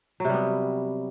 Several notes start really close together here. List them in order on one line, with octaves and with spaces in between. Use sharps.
F#3 C3 G3 B3